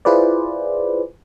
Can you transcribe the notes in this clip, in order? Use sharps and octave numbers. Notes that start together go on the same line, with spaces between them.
E4 F4 G#4 B4 C5 D5